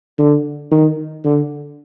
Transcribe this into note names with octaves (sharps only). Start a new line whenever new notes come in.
D3
D#3
D3